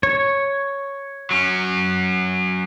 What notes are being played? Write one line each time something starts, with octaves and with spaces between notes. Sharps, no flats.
C#5
F#3 C#4